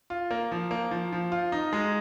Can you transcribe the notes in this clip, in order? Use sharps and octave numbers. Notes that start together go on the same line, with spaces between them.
F4
A#3
F3
A#3
F3
F3
F4
D#4
G#3